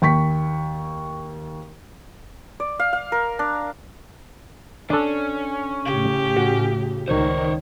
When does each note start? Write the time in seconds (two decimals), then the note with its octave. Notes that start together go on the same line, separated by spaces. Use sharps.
0.02 D#2 G5 C#6 B6
2.60 D5
2.80 F5
2.93 F5
3.12 A#4
3.39 D4
4.90 C#4 D4 A4
5.85 A2 C#3 G4
6.36 F#4
7.08 C#2 D#3 C5 C#5